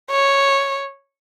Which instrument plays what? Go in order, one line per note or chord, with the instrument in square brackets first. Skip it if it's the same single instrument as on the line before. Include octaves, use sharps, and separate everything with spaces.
[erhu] C#5